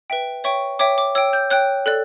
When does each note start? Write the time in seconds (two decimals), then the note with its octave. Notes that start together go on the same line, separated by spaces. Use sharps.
0.10 B4 E5 G5
0.44 C#5 E5 G5 C#6
0.79 C#5 E5 G5 D6
0.98 D6
1.15 C#5 G5 E6
1.33 G6
1.50 C#5 G5 F#6
1.86 A4 D5 F#6